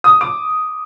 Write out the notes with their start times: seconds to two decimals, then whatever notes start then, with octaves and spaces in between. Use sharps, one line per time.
0.04 D#6
0.21 D6